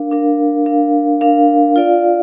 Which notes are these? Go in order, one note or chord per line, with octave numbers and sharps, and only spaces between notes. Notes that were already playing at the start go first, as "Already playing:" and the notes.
Already playing: D4 A#4 F5
D4 A#4 F5
D4 A#4 F5
D4 A#4 F5
F4 D5 F5